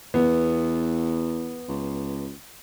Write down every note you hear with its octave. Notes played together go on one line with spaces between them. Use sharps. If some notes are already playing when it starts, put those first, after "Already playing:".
E2 B3
C#2